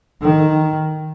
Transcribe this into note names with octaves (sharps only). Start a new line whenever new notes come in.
D#3